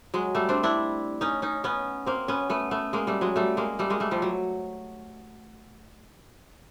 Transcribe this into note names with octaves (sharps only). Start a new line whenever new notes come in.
F#3 G#3
G3 A3
C4 D4
D4 E4
C#4 D#4
C#4 D#4
B3 C#4
A#3 C4
B3 C#4
A3 B3
A3 B3
G#3 A#3
G3 A3
F#3 G#3
G3 A3
G#3 A#3
G3 A3
G#3 A#3
G3 A3
F3 G3
F#3